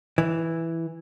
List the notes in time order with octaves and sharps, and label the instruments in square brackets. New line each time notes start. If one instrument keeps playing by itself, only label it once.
[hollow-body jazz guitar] E3